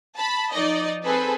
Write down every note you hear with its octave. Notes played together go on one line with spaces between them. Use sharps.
A5 B5
F3 D#4 D5 D#5
C4 G#4 A4 B4